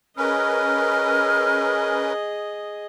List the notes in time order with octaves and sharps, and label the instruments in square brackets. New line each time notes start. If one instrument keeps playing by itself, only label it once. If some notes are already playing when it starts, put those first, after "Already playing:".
[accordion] C#4 A#4 B4 [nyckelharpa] G#4 D#5 [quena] F6